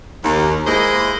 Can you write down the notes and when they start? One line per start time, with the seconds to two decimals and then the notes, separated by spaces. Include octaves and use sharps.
0.23 D#2
0.66 G#3 A#3 E4 C5 D#5